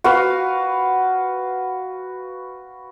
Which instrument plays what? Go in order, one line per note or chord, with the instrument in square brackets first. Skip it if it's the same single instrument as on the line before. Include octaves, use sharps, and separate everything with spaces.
[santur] F#4 B4 F5